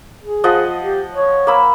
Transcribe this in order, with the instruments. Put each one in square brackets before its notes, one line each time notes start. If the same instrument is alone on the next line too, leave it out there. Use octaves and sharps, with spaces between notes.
[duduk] G#4
[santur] F3 D#5 F#5
[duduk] G4
C#5
[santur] A#3 B5 E6